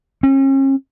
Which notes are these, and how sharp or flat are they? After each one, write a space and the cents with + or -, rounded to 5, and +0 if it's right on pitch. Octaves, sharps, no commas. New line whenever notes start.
C#4 -40